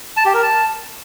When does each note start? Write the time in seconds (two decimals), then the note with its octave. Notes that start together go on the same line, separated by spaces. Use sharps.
0.17 A5
0.25 G4
0.34 A#4
0.43 A5